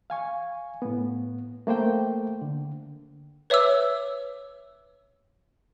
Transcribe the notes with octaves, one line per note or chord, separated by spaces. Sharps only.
F5 G#5 C#6
A2 B3
A3 A#3 C5 G5
D3
B4 C#5 E5 D6 E6